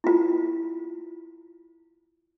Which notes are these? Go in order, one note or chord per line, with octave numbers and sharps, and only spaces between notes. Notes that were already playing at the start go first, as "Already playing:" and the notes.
E4 F4